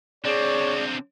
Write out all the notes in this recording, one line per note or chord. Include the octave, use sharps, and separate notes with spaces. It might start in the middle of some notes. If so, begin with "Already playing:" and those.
D3 C4 G#4 C#5 D5